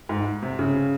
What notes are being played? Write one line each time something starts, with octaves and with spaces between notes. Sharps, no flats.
G#2
C3
C#3